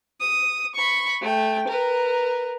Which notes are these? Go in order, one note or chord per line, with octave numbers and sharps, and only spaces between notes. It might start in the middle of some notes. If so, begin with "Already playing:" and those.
D#6
B5 C#6
A3 G5
A#4 B4